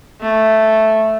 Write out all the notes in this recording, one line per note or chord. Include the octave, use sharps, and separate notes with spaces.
A3